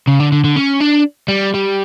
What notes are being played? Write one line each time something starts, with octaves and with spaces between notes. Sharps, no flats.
C#3
D3
D3
D3
C#4
D4
G3
G3